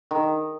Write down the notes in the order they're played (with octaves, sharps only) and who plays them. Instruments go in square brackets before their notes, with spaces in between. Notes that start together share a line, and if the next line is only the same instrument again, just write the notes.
[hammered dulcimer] D#3